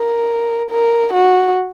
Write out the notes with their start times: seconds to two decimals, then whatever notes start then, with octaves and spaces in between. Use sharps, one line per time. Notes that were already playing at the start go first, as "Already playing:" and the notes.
Already playing: A#4
0.70 A#4
1.13 F#4